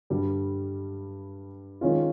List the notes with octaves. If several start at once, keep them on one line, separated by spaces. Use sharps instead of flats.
G2 D3 G3
D#3 G#3 C#4 F4